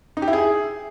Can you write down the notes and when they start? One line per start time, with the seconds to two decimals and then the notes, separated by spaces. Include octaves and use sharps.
0.17 D#4
0.22 G4
0.28 E4
0.33 G#4